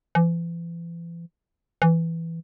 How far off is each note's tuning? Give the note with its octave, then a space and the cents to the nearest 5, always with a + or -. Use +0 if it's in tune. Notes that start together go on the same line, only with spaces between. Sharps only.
E3 +40
E3 +5